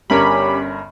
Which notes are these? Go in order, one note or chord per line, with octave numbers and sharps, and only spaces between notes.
G1 G2 C#4 G4 A#4 B5